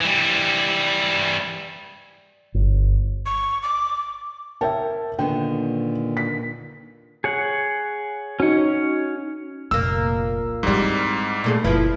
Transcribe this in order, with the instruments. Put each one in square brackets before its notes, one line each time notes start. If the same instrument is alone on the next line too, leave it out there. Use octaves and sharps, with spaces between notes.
[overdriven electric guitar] E3 G3
[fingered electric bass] G1
[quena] C#6
D6
[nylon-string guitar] A#4 C#5 [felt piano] E5 G5 A5
[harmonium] A#2 [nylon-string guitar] D3 D#3 B3 [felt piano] G5
[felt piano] B6
[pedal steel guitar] G#4 C#5 F#5
[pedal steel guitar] C#4 C#5 [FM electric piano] D#4 F#4
[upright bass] F1 C2 [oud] A#2 A#3 [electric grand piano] E6
[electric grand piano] G#2 G3 [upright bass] C4 E4
[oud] A#2 A3 G#4
[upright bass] F#1 [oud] F3 E4 B4